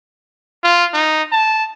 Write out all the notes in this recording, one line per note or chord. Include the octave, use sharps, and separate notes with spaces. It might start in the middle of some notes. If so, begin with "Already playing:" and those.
F4
D#4
A5